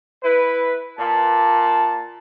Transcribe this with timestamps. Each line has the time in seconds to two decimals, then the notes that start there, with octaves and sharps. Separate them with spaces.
0.24 E4 B4
0.99 A#2 A5